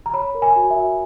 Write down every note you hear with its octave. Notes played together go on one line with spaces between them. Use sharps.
A#5
C#5 B5
A#4
G#5
F#4
E5
F#4